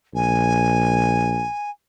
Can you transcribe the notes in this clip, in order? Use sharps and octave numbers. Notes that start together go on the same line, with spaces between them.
A#1 G#5